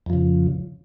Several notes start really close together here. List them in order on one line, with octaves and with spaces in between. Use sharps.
F2 F3 C#3